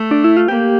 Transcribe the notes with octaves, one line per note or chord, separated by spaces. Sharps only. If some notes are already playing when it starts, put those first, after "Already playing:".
Already playing: A3
D4
E4
F4
A#3 G4